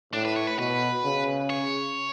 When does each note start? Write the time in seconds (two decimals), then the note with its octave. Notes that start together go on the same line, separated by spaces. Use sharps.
0.13 A2 D4
0.25 B4
0.36 C#5
0.47 B4
0.59 B2 B4
1.05 C#3
1.50 C#5